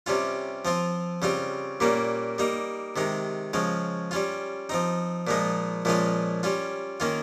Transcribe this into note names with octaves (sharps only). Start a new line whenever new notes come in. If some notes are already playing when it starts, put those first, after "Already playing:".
C3 G3 C#4 F4
F3 C4 F4
C#3 G3 C4 F4
A#2 G3 A#3 C#4
G3 A#3 D#4
C3 D#3 G#3 D#4
C#3 F3 G#3 C#4
G3 C#4 F4
F3 C4 D#4
A#2 F3 G#3 D#4
A#2 F3 G#3 C#4 F4
G3 C#4 F4
D#3 A#3 C#4 F4